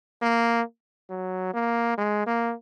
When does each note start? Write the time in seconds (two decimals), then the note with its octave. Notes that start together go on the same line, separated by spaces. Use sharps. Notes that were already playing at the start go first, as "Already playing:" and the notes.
0.22 A#3
1.10 F#3
1.54 A#3
1.98 G#3
2.27 A#3